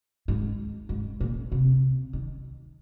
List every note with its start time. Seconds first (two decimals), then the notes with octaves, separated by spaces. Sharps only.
0.28 G#2
0.89 G#2
1.20 A#2
1.52 C3
2.13 D#3